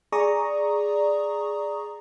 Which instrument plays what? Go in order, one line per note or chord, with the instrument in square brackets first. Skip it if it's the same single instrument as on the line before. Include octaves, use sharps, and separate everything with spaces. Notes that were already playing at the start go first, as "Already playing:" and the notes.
[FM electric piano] G#4 D5 A#5 C#6 D#6